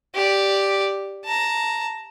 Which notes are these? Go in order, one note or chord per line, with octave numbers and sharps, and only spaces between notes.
G4 D5
A5 A#5